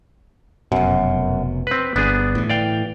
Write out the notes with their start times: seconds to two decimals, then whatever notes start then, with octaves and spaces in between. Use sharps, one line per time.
0.72 F1 F#2 B2
1.67 C4 B4
1.96 G1 B3 D4 G#4
2.35 A2 E3
2.50 D5 F5 G5